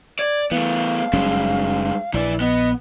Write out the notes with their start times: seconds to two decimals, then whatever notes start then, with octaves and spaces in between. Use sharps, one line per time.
0.19 D5 G#6
0.51 E3 A3 B3 F5
1.13 F#1 G2 F#3 G#3 C#4
2.14 A#1 E3 E4 D5
2.40 B3 D#5